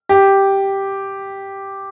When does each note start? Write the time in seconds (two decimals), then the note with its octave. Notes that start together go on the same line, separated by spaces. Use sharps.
0.09 G4